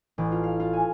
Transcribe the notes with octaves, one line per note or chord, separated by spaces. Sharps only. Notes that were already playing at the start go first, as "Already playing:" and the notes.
A1
F4
F5
F4
G#5